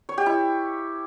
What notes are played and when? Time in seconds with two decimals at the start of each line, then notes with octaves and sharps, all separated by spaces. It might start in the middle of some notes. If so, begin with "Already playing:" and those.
0.09 C#5
0.18 G4
0.26 E4